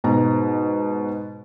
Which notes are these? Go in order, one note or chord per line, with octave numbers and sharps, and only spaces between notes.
G#2 B2 A#5